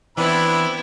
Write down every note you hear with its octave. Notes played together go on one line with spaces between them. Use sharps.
E3 B3 C4 D4 E4 E5 B5